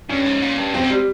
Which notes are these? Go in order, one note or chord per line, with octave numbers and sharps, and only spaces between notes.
G2 C#4
G#2
A#2
G2
F2 C4
G#2
G3